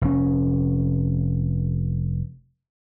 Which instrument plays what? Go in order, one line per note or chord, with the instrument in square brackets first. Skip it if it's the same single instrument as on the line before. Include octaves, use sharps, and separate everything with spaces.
[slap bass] F1 C#4